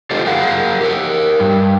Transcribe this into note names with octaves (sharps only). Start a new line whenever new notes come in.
F4 G4 A4 C5 D#5
G#4 A#4 F5 F#5
G4 A#4
G2